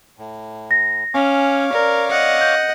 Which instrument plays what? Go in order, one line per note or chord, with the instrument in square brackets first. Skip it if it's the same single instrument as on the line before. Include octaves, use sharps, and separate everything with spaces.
[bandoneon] A2
[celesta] A#6
[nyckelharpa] C#4 [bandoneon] C#5 F5 D6 [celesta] G#5
[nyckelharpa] A#4 [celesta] D5
[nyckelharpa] D#5 F#5
[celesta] G6